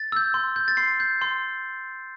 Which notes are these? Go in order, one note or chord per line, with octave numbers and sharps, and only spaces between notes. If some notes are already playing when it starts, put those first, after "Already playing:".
Already playing: A6
E6 G6
C6
G6
A6
C6 C7
G6
C6